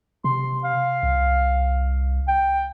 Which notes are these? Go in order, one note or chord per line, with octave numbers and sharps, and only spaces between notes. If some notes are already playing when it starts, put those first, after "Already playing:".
C3 C6
F5
C2
G5